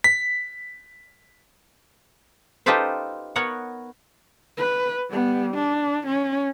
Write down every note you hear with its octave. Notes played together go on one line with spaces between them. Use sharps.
B6
D#4 F4 G4 A4 B4 C5
B3 A#4 C#5 F#5
B4
G3 B3
D4
C#4